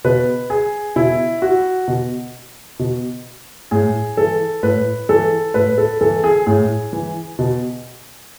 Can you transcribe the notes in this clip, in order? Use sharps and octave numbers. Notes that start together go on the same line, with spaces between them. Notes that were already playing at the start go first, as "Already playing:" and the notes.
B2 B4
G#4
B2 E4
F#4
B2
B2
A2 G#4
E3 A4
A2 B4
E3 A4
A2 B4
A4
E3 A4
G#4
A2 G#4
E3
B2